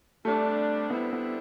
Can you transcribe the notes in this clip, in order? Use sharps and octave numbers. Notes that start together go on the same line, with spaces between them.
C3 G3 A3 D4
D3 G3 B3 C4 E4
B3